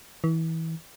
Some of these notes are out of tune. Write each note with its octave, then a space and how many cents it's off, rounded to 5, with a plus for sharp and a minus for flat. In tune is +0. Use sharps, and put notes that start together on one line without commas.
E3 -25